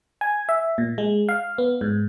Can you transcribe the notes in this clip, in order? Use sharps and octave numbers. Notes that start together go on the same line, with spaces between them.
G#5
E5
A#2
G#3
F5
B3
G#2